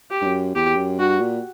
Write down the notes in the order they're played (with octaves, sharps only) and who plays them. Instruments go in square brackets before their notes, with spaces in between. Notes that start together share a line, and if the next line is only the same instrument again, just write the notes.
[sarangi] G4
[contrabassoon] G2
F#2
[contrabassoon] E2 [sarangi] G4
[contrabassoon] F#2
[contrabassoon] G2 [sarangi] F#4
[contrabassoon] A#2